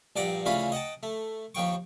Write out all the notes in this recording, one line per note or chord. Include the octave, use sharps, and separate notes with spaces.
A#1 G2 D5 F#5 G5 A#5
D2 C#3 E3 C#4 F4 B5
D#5 F#5 G5 A5
A3
D#2 D#3 F3 G5 C#6